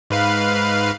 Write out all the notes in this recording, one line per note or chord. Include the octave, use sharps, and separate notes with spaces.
G#2 B4 F5